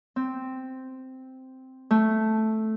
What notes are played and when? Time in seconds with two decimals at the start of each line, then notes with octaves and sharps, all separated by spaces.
0.16 C4
1.91 A3